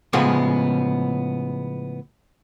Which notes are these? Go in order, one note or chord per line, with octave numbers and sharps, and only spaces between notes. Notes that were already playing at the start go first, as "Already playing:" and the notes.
A2 C#3 F3 G#3 B3